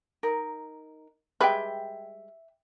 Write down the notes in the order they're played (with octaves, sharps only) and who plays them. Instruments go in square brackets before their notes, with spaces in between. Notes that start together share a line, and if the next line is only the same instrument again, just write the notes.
[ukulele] D#4 A#4
[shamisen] G3 G#3 B4 [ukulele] E5 G5